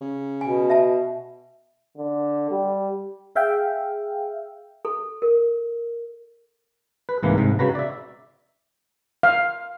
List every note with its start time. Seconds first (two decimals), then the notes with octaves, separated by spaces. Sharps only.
0.01 C#3
0.41 B2 G#5
0.70 E5 A5
1.97 D3
2.51 G3
3.36 G#4 E5 F5 G5
4.85 A4
5.22 A#4
7.09 B4
7.23 C2 G#2 E3 A#3
7.37 C2 G#2 C3
7.59 C#3 F#4 B4 A#5
7.75 D5 E5
9.23 F5